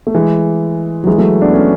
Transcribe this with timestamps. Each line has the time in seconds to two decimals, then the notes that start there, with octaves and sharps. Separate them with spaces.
0.07 A3
0.14 E3 G#3
1.04 F#3
1.07 E3 G#3
1.18 F#3 A3
1.42 B3 D4
1.54 A3 C#4